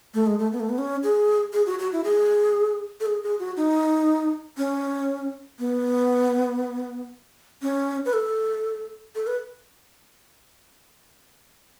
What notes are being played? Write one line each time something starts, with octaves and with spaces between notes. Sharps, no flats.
A3
G#3
A3
B3
A3
B3
C#4
G#4
G#4
F#4
F#4
E4
G#4
A4
G#4
G#4
F#4
D#4
C#4
B3
C#4
B4
A4
A4
B4